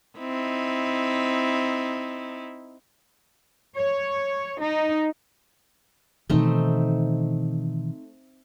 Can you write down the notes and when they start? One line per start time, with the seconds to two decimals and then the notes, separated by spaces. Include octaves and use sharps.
0.19 C4 D#4 E4
3.75 C#5
4.61 D#4
6.30 B2 D#3 E3 A3 C4 D#4